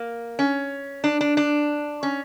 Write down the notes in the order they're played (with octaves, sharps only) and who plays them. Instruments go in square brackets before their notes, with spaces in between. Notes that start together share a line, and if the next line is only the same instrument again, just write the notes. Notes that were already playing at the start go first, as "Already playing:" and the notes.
Already playing: [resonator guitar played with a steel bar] A#3
C#4
D4
D4
D4
C#4